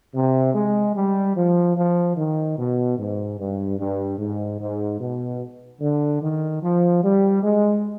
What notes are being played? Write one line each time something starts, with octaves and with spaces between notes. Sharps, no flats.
C3
G#3
G3
F3
F3
D#3
B2
G#2
G2
G2
G#2
G#2
B2
D3
D#3
F3
G3
G#3